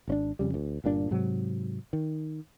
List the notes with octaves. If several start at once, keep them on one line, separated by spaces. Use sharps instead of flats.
G#1 C#4 D4
F2 C#3 G3
D2
G1 G2 A#2 D4
G#2 C3 F#3
D#3